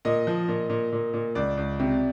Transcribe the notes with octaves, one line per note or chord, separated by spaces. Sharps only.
A#2 D#5
F3
A#2
A#2
A#2
A#2
C#2 D5
C#2
C3